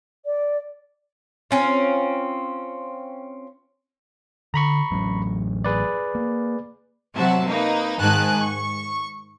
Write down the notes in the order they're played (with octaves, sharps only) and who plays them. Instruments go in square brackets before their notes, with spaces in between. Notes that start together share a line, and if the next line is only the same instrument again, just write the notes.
[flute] D5
[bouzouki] C4 C#4 F4
[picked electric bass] D3 [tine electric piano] A#5 B5 C#6
[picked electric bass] A1 F#3 C#4
[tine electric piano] G#4 B4 D5
[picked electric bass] A#3
[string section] C3 F#3 F#4 E5 A5
A#3 D#4 B4
G#2 D#3 G#5 A5 F#6
C#6